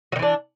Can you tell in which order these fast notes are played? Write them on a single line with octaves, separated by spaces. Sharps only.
F#3 D#3 E3 D4